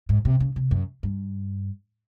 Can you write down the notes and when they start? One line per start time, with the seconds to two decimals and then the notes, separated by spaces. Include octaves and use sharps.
0.09 G#2
0.25 C3
0.40 C#3
0.56 C3
0.71 F#2
1.03 G2